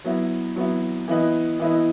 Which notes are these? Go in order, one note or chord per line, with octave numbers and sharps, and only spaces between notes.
F#3 B3 E4
F#3 B3 E4
E3 B3 E4 B4 D#5
E3 B3 E4 B4 D#5